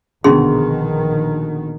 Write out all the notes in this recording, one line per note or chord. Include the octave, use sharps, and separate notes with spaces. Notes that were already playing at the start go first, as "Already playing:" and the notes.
A#1 B2 D3 D#3 B3 C#4 G#4 C6